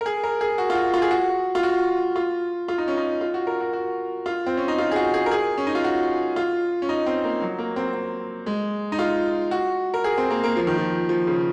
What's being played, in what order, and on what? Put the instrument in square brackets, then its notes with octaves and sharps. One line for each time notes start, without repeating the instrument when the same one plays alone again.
[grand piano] A#4
G#4
A#4
G#4
F#4
F4
F#4
F4
G#4
F#4
F4
F#4
F4
F4
D#4
C#4
D#4
F4
F#4
A#4
F#4
F#4
F4
C4
C#4
D#4
F4
G#4
F#4
G#4
A#4
G#4
C#4
D#4
F4
F#4
F4
C#4
D#4
C4
A#3
F#3
A#3
C4
C4
G#3
D#4
F4
F#4
A#4
G#4
C4
A#3
A#3
F3
D#3
F3
F3
C#3